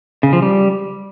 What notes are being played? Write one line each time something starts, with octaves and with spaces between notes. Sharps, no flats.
C#3
F3
G3